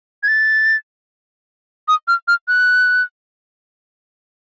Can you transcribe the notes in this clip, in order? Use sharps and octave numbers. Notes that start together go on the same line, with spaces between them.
G#6
A6
D#6
F6
F6
F#6